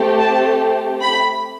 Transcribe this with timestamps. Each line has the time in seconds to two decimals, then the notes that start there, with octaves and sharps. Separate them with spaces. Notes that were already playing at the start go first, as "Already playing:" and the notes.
Already playing: A3 C4 G4
0.20 A5
1.01 B5